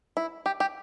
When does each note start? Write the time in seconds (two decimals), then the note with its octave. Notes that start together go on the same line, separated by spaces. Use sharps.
0.17 E4
0.46 G4
0.60 G4